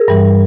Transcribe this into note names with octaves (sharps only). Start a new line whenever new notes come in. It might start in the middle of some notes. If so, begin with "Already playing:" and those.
Already playing: G#4 A#4
G2 E3 G3